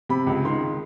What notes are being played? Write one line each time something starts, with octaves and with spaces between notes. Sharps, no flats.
C3 B5
C#2
D#3 C6